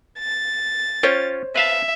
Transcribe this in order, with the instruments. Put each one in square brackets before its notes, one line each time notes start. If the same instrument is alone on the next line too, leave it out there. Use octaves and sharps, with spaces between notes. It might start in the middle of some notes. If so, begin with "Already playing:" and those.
[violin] A6
[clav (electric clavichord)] C#4 F4 G5 [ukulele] C5 C#5
[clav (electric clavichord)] B4 F5 A5 [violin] E5